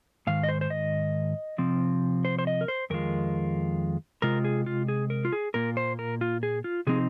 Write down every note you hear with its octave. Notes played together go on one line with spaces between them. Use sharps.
G#2 D#3 F5
D#5
C5
C5
D#5
C3 F3 C4
C5
C5
D#5
A#4
C5
F2 D#3 G#3 F4 A#4
C3 G#3 F4 A#4
G#4
F4
G#4
A#4
F4
G#4
A#2 A#3 F4 A#4
C5
A#4
F4
G#4
F4
C3 F3 C4 D#4 G#4